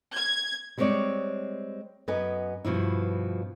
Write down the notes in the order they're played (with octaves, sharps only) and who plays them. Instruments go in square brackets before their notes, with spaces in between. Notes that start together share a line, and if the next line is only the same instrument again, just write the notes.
[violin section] G#6
[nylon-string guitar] G3 G#3 B3 C4 C#5 D5
F#2 B3 B4 D#5 G#5
G2 B2 F3 E4